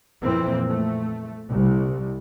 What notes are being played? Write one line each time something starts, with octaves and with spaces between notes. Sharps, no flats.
F2 A#2 E3 A#3 C4
A3
C2